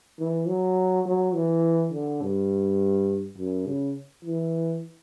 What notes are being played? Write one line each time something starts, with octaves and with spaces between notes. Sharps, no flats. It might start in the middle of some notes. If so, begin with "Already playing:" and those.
E3
F#3
F#3
E3
D3
G2
F#2
C#3
E3